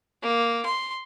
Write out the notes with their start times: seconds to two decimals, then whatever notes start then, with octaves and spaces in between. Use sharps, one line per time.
0.23 A#3
0.65 C6